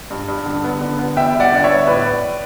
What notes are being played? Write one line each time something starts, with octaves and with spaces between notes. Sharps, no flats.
G2
G2
D3
B3
D3
B3
E2 E5 G5
G3
D5 F#5
D3 D5
C#5 E5
B3
A2 B4 D5